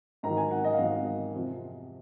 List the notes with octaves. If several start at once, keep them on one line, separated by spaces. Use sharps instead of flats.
G#2 D#3 F#3 A#5
G#5
F#5
D#5
F5
G#2 D#3 F#3 D#5
F2 C3 F3